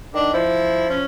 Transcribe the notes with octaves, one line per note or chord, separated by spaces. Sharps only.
D#3 D4
F3 E4
C#4